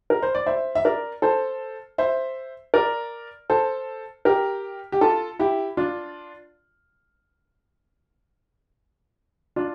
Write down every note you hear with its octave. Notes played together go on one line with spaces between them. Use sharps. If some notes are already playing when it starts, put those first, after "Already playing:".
A#4
C5
D5
C5 E5
E5
A#4 D5
A4 C5
C5 E5
A#4 D5
A4 C5
G4 A#4
G4
F4 A4
E4 G4
D4 F4
D4 F4